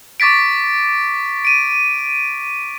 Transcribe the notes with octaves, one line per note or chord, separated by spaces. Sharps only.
C#6 D6 A6 B6 D7
D7 D#7